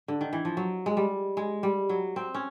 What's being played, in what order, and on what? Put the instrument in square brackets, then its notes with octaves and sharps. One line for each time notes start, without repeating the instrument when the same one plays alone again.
[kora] D3
D#3
E3
F3
F#3
G#3
G3
G#3
G3
F#3
C4
C#4